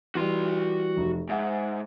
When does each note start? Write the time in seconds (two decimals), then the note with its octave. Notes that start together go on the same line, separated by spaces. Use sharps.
0.15 E3 G3 F#4 C6
0.97 F1
1.29 G#2 E5 F#5